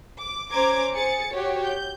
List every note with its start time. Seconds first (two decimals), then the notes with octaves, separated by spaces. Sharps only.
0.19 D6
0.51 C#4 C5 A#5 D6 G#6 D7
0.94 G#4 C5 A6 C#7
1.33 F#4 G4 C#5
1.64 G6